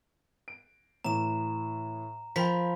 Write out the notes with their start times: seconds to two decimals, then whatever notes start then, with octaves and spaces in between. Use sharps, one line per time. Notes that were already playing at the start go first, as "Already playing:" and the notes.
0.48 D7
1.04 A2 E3 A#5 E7
2.36 F3 A#4 G5 B5 B6